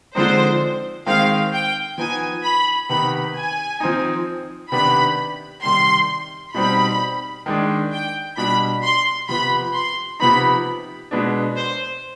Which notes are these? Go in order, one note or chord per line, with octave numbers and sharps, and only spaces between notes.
D3 F3 G#3 C4 D#4 C5
D#3 G#3 C4 F5
G5
F3 B3 D#4 G#5
B5
C3 D#3 B3 D#4 B5
G#5
F3 C4 D#4
C3 D#3 B3 D4 B5
C3 D#3 G3 C6
B2 G3 C4 D#4 B5
D#3 G#3 D4
G5
B2 G3 D4 B5
C6
C3 F3 B3 B5
C6
C3 F3 B3 D#4 B5
B2 G#3 B3 D4
C5